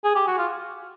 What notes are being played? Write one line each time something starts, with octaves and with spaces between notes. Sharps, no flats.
G#4
G4
F#4
F4